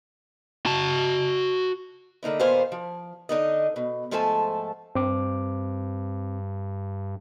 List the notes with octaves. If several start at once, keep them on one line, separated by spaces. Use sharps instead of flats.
F#4 A5
D3 A#3 D#4 E4
D#2 A#2 B3 C5 F5 G#5
F3
D3 D#4 D#5
B2
G#2 F3 A3 A4 G#5 A5
G2 C4 D6